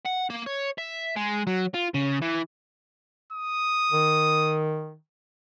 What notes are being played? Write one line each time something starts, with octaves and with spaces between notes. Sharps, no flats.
F#5
A#3
C#5
E5
G#3
F#3
F4
C#3
E3
D#6
D#3